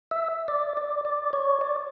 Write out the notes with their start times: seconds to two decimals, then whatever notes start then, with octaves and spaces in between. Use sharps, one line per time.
0.11 E5
0.48 D5
0.77 D5
1.05 D5
1.33 C#5
1.61 D5